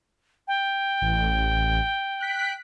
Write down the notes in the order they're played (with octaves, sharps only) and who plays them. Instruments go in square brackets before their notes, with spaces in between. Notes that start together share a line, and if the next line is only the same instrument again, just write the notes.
[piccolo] G5
[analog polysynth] A1
F#6 B6 D7